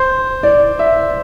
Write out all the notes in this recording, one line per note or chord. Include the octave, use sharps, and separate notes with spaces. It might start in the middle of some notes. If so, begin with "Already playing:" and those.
Already playing: C5
D5
E5